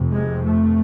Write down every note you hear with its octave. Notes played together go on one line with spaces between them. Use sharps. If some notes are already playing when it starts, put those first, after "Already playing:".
Already playing: F1 F2 C3
G#3
A3